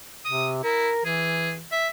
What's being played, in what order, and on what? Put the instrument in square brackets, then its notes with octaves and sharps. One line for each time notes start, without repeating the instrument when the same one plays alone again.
[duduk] C3 [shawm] D#6
[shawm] E4 [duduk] A#4
[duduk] E3 [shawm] G#4
[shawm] E5